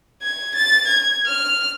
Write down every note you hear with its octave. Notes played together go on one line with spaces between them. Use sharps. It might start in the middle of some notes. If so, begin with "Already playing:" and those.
G#6
A6
G#6
F6